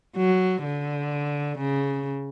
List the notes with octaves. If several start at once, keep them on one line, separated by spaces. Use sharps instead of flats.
F#3
D3
C#3